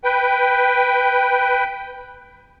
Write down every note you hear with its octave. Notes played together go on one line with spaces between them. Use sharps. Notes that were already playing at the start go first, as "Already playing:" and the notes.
B4 G5